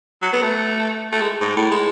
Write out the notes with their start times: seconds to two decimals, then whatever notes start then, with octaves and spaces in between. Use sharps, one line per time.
0.22 F#3
0.33 B3
0.42 A3
1.12 A3
1.21 G#3
1.41 G#2
1.56 A2
1.71 G#3